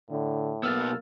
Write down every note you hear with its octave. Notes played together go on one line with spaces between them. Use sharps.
A2 D3
B1 A#3 B3 E6 F6 A6